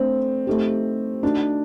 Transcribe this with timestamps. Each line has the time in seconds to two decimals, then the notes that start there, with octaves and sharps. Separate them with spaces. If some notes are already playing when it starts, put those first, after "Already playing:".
Already playing: A3 C4 D4 A4
0.47 A3 D#4 G4
1.23 A3 D4 D#4 F#4